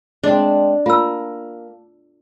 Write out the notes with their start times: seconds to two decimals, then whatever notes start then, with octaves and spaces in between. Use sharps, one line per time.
0.24 G#3 C4 D4
0.86 A#3 F4 E6